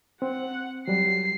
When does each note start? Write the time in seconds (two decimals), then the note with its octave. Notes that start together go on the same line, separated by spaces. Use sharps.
0.22 C4 F#5
0.88 F#3 G3 C7